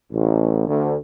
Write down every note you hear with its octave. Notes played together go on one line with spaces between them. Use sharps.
A1
D2